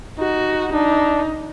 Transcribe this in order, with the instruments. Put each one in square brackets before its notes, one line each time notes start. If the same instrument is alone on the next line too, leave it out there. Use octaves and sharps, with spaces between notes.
[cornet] D#4 [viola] F#4
[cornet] D4 [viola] D#4